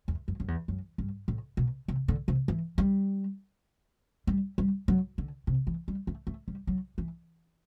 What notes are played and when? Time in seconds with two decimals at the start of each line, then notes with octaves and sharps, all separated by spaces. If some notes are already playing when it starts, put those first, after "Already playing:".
0.08 E2
0.28 F#2
0.40 F#2
0.48 E2
0.68 F#2
0.98 G2
1.28 A2
1.57 B2
1.88 C3
2.08 D3
2.28 C3
2.48 E3
2.78 G3
4.27 G3
4.58 G3
4.88 F#3
5.18 D3
5.47 C3
5.67 E3
5.88 G3
6.07 A3
6.27 A3
6.48 G3
6.67 F#3
6.98 E3